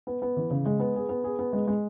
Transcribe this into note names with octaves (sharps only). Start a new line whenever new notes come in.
B3
B3
E3
C#3
G#3
B3
G#4
B3
G#4
B3
G#3
G#3